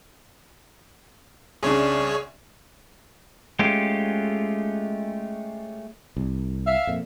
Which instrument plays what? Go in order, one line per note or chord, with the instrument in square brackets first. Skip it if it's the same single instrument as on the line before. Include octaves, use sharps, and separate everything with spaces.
[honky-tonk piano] C2 C#3 D4 [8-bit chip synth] G#4 C#5
[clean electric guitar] G#3 A3 C#4 F4 G4
[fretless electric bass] C2
[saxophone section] E5 F5
[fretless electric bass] F2 A#2